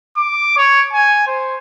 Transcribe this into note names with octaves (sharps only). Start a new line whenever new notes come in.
D6
C#5
G#5
C5